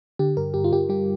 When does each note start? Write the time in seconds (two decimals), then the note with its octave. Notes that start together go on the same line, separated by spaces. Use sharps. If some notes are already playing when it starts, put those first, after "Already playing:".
0.19 D3 G4
0.37 G2 A#4
0.54 G2 G4
0.64 F4
0.72 G2 G4
0.89 G3 G4